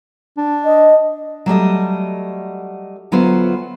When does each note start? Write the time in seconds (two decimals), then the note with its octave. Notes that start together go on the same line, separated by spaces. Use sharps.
0.37 D4
0.65 D#5
1.46 F#3 G3 A3 D#5
3.12 D2 F#3 B3 F4 B4 C5